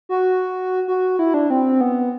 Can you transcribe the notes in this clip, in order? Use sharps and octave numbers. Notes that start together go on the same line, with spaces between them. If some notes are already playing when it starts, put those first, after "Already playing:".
F#4
F#4
E4
D4
C4
B3